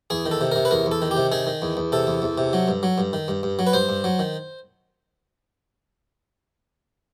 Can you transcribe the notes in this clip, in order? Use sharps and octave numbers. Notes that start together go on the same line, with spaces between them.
E2 G#4
D#3
A4
C3
C3 A#4
B4
E2 A#4
E2
A4
D#3
G4
C3
D#3 G#4
D#3
E2
E2
C3 A4
E2
E2
C3
F#3
G2
F#3
G2
D#3
G2
G2
F#3
B4
G2 C5
G2
F#3
D#3